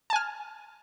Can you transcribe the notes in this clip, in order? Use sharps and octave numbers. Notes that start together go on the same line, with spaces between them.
G#5 A5 F6